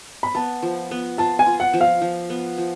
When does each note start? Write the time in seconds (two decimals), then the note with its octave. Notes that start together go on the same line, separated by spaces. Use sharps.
0.23 B5
0.34 B3 A5
0.63 F3
0.91 B3
1.18 F4 A5
1.39 G#5
1.46 F4
1.60 F#5
1.73 F3
1.81 F5
2.02 F3
2.30 B3
2.58 F3